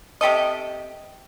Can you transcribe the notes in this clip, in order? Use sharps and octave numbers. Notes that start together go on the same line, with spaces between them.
C3 G4 A4 D#5